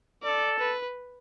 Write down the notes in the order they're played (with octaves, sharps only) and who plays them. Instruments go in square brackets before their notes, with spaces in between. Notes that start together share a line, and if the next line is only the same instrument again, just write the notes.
[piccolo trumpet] A4 [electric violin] D5
[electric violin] B4